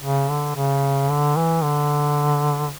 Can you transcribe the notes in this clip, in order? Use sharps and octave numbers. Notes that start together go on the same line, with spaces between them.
C#3
D3
C#3
D3
E3
D3